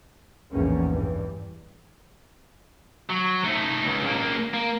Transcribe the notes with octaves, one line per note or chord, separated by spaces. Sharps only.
A#1 E2 G#2 G3 A#3 C#4
G2 E3 G3
F#3
A3 D#4
C#2
C#2 A#3
A#3